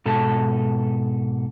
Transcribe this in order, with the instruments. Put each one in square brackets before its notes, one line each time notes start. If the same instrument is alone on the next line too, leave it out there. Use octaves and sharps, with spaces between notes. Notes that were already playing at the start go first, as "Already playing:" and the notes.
[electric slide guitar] G#2 B2 A4 A5